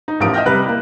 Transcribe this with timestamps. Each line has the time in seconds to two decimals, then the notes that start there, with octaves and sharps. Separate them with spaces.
0.08 D#4
0.20 A1 F3 G4 A#4 D#6 D7
0.34 D#5 E5 G5 F6 G6 A#6
0.45 C3 G3 B4 G5 A#5 F#6
0.66 A#3 E4